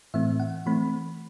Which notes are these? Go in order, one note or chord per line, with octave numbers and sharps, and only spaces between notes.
A2 E3 A3 C4 E5
F#5
E3 A3 C4 B5